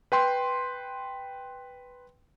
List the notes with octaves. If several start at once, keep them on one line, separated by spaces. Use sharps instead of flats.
B4 G5 C6